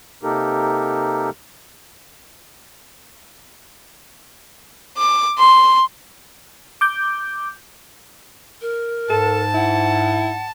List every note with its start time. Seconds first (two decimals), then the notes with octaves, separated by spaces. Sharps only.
0.23 C3 A#3 D#4 G4 A4 A#4
4.98 D6
5.38 C6
6.81 D6 G6
8.61 A#4
9.10 G#2 A4 A5
9.55 E4 F#5